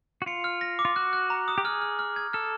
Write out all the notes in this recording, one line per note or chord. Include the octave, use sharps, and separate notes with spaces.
F#4
F4 C#7
F6
A#6
D6
F4
F#4 F#6
F#6
A#5
D#6
G4
G#4 F6
F6
F6
G#6
A4 F6